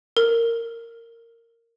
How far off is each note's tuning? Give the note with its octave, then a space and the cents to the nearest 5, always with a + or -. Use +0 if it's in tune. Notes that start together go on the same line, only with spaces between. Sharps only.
A#4 -15